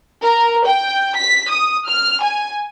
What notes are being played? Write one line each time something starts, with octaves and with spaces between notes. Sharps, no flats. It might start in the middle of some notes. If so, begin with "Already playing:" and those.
A#4
G5
B6
D#6
F6
G#5